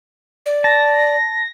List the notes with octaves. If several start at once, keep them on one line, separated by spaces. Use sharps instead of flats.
D5
A5 A#6